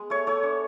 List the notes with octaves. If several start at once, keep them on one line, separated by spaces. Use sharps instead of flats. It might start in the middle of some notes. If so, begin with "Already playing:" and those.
Already playing: G#3 B3
A3 C#5
A3 C#5
D4